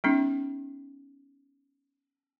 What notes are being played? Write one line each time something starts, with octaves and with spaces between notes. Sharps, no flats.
G3 B3 C#4 D#4